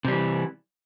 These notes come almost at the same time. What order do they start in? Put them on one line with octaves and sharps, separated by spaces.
C3 G3 E3